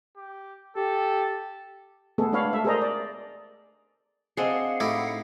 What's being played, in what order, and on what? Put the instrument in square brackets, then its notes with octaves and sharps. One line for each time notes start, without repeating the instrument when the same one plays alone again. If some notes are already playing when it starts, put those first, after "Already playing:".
[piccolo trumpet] G4
[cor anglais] G4 [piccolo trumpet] A4
[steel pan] A3 B3 G#4 A4
G#3 D4 B4 C#5 F5 B5
A4 E5
G#4 A#4 C5 D5 D#5 A#5
D5
[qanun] C4 D#5 C6 [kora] D4 G#4 [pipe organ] F5 F#5
[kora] A2 [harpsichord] D#4 E4 G4